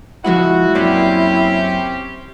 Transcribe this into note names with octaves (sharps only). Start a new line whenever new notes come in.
F3 G#3 E4 F#4 F#5
F#2 A#3 C4 C#4 G4 D5